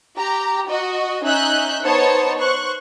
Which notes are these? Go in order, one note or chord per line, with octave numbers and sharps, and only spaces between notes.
G4 A#5
F#4 D#5
C#4 D#4 E5 F#6 G6
B3 D#4 C5 C#5 A5 C#7
C5 C#6 F#6